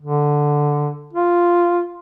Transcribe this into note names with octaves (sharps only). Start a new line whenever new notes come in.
D3
F4